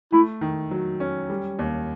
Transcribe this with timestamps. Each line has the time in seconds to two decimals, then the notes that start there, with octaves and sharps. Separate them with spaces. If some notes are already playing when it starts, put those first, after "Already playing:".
0.12 A3 E4
0.41 D#3
0.71 F#3
1.00 C#4
1.30 G3
1.59 D#2